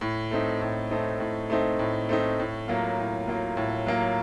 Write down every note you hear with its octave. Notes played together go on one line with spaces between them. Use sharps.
A2
A3 C4 D#4
A2
A3 C4 D#4
A2
A3 C4 D#4
A2
A3 C4 D#4
A2
F#3 A#3 F4
A2
F#3 A#3 F4
A2
F#3 A#3 F4